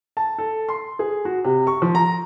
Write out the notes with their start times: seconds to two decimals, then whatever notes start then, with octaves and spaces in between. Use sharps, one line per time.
0.17 A5
0.38 A4
0.69 C6
0.99 G#4
1.25 F#4
1.45 C3
1.67 C#6
1.82 F3
1.95 A#5